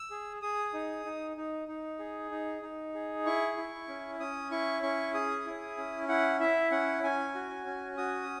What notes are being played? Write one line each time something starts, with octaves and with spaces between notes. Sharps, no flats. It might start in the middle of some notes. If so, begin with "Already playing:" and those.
Already playing: E6
G#4
G#4 D#6
D#4
D#4
D#4
D#4
G#4
D#4
D#4
G#4
E4 C#6
E4
C#4
C#4 D#6
E4 C#6
C#4 C#6
G#4 D#6
E4
C#4
E4 F#5
E4 E5
C#4 F#5
C#4 G#5
F#4
C#4
F#4 D#6